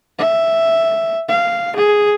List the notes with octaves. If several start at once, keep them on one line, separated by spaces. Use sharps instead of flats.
E5
F5
G#4